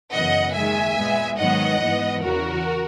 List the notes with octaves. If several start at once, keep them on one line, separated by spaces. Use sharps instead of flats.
F#2 C#3 E3 B3 D#5 F#5
D#2 D#3 G#3 E5 G#5
A#2 G#3 B3
G#2 D#3 F#3 B3 D#5 F#5
G#2 E3 B3
E2 C#3 E3 F#4 A#4